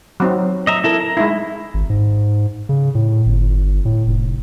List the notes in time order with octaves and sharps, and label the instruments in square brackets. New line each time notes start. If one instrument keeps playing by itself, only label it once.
[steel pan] F#3 C4 D#4
[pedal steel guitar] D#5 E5 A#5
E4 A4 A#4
A#5
[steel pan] G#3 D#4 E4
[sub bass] G#1
G#2
C#3
A2
G1
A2
F1